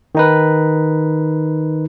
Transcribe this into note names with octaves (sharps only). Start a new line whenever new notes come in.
D#3 D#4 B4